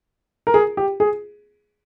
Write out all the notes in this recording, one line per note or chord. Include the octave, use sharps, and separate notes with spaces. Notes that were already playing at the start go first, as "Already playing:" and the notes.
A#4
G#4
G4
G#4